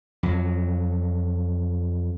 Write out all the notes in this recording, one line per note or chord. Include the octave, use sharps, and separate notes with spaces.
F2 F#3